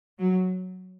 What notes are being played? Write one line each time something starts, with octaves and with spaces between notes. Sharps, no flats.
F#3